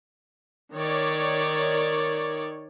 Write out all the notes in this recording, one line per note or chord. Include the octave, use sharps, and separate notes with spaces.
D#3 C#5 D5